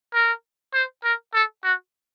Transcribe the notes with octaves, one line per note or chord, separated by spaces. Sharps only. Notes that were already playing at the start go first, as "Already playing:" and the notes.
A#4
C5
A#4
A4
F#4